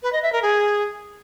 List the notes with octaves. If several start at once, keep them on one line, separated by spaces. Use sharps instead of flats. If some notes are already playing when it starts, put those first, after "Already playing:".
B4
D#5
E5
A#4
G#4